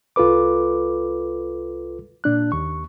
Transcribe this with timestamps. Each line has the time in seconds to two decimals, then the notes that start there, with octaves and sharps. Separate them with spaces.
0.16 C2 F4 A4 B4 D6
2.24 A#2 D4 F#6
2.52 D#2 C#6